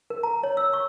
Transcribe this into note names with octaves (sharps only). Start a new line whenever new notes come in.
A#4
A#5
C#5
E6
C#6